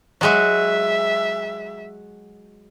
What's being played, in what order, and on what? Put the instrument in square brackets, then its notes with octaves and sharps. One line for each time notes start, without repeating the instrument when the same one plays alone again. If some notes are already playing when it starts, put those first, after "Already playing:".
[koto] F#3 G#3 F#4 [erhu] E5